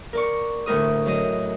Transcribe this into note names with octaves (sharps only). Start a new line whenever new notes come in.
A#4 D5 C#6
D2 A2 A#4 D#6
F#2 D#5